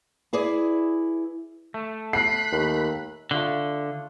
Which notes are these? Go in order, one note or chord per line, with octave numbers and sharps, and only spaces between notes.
E4 G#4 B4 D5
A3
B5 F#6 C7
D#2
D3 A3 F4 D#6